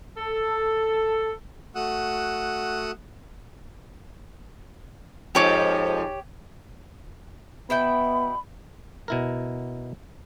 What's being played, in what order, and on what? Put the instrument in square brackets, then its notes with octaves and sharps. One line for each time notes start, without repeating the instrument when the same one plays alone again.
[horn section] A4
[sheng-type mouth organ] A3 F#4 F#5 D#6 E6 F#6
[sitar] F2 G#2 F3 [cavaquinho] G4 C#5 D6
[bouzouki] B2 E4 G5 [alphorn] B3 [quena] B5
[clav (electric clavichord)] B2 E4 A#4